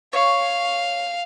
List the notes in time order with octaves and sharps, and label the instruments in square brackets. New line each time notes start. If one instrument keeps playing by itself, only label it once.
[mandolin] C#5 [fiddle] F5